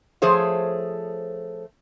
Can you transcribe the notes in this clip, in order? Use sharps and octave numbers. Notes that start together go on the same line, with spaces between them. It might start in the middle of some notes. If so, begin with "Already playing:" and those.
F3 A3 G#4 C5 C#5